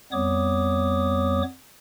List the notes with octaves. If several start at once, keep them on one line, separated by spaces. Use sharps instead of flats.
F2 G3 B3 C#5 D6 D#6